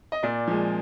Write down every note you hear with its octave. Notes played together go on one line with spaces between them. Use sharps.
D#5
A#2 D5
F3 G#3